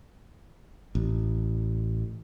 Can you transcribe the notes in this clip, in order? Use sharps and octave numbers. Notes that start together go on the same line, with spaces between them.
A1